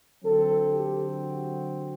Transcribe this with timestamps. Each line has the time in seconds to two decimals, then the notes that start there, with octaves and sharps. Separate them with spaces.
0.23 D3 F#3 C4 A4
0.71 G4
1.19 F#4